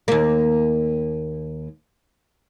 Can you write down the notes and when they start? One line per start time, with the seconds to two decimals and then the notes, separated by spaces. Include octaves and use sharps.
0.08 D#2 A#3